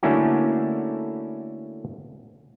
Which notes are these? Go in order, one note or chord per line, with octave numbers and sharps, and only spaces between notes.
D3 A3 A#3 C#4 E4 F#4